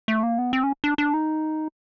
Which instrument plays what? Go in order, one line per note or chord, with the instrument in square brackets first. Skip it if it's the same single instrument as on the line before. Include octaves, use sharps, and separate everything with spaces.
[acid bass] A3
A#3
B3
C4
C#4
D4
D4
D#4